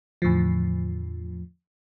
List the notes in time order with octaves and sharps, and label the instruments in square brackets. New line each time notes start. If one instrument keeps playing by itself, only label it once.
[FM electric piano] E2 A2 D3 F3